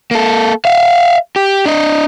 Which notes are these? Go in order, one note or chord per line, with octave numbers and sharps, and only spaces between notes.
A#3 A4
E5 F5
G4
D4 D#5